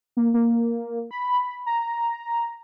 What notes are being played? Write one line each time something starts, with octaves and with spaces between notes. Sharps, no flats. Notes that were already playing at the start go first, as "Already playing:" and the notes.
A#3
A#3
B5
A#5